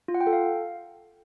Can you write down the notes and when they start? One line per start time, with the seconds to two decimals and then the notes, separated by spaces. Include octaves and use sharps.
0.08 F4
0.14 F#5
0.21 G5
0.27 A4
0.33 F5